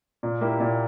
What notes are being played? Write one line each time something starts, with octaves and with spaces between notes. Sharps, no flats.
A#2
A#3 E4 G4
A#2